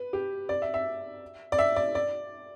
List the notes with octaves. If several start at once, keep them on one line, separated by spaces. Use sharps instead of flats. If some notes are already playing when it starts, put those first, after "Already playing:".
Already playing: B4
G4
D5
E5
E5
D5
E5
D5
D5